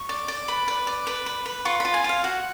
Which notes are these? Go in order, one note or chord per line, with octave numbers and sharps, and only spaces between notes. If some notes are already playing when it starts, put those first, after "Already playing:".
Already playing: C#6
D5
D5
B4 B5
B4
D5
B4
B4
B4
F4 C#6
F4 B5
G#5
F4 F5
F#4 F#5